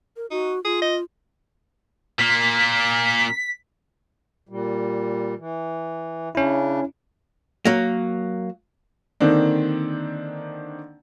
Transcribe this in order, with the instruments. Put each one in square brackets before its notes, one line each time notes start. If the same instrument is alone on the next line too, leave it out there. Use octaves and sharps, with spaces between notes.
[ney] A#4
[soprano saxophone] D#4 [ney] F#4
[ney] F4 [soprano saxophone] G#4
[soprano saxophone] D#5
[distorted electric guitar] A#2 A#3 [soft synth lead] B6
[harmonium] A#2 G3
E3
[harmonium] C#3 D4 [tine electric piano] C#4 E4
[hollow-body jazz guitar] F#3 A#3
[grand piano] D3 D#3 A#3 C4 D4